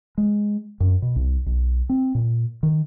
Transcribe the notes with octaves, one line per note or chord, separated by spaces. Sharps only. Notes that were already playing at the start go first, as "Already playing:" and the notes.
G#3
F#2
B2
C2
B1
C4
A#2
D#3